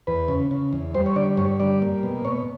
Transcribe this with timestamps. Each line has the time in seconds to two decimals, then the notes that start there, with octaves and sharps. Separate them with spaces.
0.07 E2 B4
0.28 C#3
0.51 C#3
0.73 E2
0.94 G3 C5
1.06 C#5
1.16 D3 D5
1.37 G2 C#5
1.60 G3 D5
1.82 A#3
2.03 B2
2.25 B2 C#5